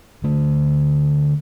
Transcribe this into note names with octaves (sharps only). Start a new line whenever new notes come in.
D3 A3